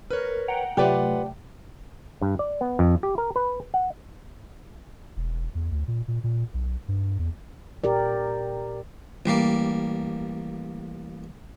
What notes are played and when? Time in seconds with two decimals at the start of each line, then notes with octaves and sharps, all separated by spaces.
0.10 A#4 B4 C#5
0.48 F#5 G5 A#5
0.77 C3 F#3 A3 F4 G4 B4 D5 F#5
2.21 G2
2.39 D5
2.61 B3
2.79 F2
3.03 G4
3.18 A#4
3.36 B4
3.74 F#5
5.17 E1
5.55 E2
5.72 D2
5.88 A#2
6.08 A#2
6.24 A#2
6.54 B1
6.88 G2
7.19 E2
7.84 A#2 G4 A#4 D5
9.26 A1 G3 A#3 D5